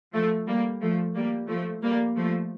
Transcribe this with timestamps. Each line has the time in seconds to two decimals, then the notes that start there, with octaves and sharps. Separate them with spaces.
0.13 F3 A3
0.47 G3 A#3
0.81 F3 A3
1.15 G3 A#3
1.49 F3 A3
1.83 G3 A#3
2.16 F3 A3